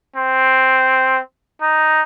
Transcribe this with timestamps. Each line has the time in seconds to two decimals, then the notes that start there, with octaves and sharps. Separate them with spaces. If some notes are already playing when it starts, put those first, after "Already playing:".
0.16 C4
1.62 D#4